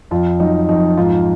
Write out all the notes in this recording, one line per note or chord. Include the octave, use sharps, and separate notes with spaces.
F2 F4
F#3 D#4
F2 D#4
G#2 F4